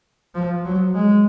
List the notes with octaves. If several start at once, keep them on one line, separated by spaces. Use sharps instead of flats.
F3
F#3
G#3